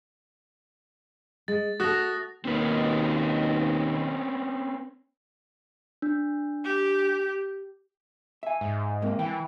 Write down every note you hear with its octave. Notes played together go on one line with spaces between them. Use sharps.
G#3 A6
A3 F#4 A4 D#6 F#6 A#6
D#2 B2 D#3 C4 C#4 B4
D4
G4
E5 G#5
G#2
G#3 A#3 C4
E3 G5